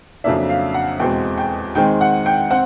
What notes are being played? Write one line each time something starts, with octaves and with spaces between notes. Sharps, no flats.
F2 C#3 F#3 A#3 D4 E5
F5
F#5
E2 B2 G#3 C4 G5
G5
D#3 G#3 C4 G5
F#5
G5
C4 F#5